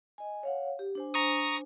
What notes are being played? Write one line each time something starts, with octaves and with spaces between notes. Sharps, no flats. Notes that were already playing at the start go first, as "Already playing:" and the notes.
D#5 G#5
C#5 F5 F#5
G4
D4 C5 G#5
A#5 C#6 D#6